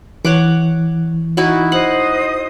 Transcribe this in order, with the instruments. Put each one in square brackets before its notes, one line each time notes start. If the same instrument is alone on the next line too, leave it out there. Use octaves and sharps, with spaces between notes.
[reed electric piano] E3 [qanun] C#5 F#5 D6
[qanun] D#4 E4 F#4
[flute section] C5 D#5 D#6 [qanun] F#5